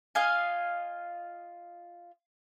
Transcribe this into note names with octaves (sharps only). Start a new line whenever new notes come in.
F4 D#5 F5 G#5